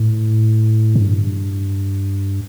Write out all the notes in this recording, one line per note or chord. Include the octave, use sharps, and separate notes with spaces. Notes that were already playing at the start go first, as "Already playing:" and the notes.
Already playing: A2
G2